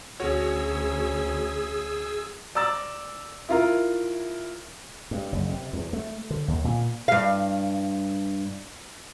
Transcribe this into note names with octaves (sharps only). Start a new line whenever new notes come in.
D2 C#4 F#4 G#4 C#5 E6
D5 A#5 E6 A6
E4 F4 A#4
G2
F#1
C3
E2
A3
D3
D#2
A#2
G2 F5